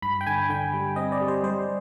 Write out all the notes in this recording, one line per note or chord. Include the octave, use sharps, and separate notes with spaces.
G2 B5
G5
D3 G#5
D3 G5
G3
C4 D#5
D5
G3
C5
G3 C5